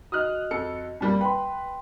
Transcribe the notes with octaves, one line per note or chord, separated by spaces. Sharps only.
F#4 D#5 D#6 F6 F#6
F2 A4 C#7
F2 G3 A#3
B4 G5 B5 C6